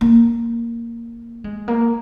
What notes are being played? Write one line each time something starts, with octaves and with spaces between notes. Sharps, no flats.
A#3
G#3
A#3